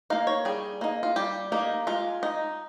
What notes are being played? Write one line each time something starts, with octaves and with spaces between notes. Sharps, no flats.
A#3 D#4 F5
C#5
G3 G#4
A#3 D#4
F4
G3 G4
A#3 D#4
G#3 F4
D#4